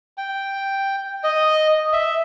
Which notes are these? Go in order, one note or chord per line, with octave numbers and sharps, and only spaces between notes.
G5
D#5
E5